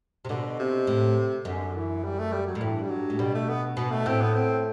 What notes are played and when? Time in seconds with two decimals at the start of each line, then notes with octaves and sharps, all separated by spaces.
0.25 C3
0.29 B2 D3
0.59 C3
0.87 A2
1.45 F#2 D3
1.75 E3
2.04 G3
2.18 A3
2.32 G3
2.46 F#3
2.55 A2
2.61 G2 E3
2.82 G3
2.90 F#3
3.10 A2
3.19 B2 G3
3.34 A3
3.49 B3
3.77 B2 B3
3.91 A3
4.06 A2 C4
4.21 B3
4.34 C4